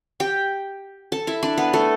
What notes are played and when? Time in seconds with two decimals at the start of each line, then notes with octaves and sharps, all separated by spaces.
0.20 G4 G5
1.12 A4 A5
1.27 E4 E5
1.43 D4 D5
1.58 B3 B4
1.73 A3 A4